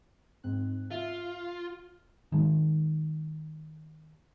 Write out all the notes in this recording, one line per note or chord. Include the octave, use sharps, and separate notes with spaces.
G#2 C4 F#6
F4 E5
F6
D#3 G#3